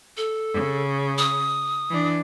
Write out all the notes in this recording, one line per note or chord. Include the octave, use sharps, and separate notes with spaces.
A4
C#3
D#6
E3 D4